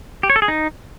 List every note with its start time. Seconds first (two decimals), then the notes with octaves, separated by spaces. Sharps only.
0.23 G4
0.30 C#5
0.36 A4
0.42 G#4
0.48 D#4